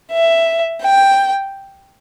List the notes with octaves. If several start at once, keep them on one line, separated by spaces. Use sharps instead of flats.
E5
G5